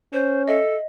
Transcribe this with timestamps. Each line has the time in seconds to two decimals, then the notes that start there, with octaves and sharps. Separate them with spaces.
0.13 C#4 C5
0.48 A4 D#5 E5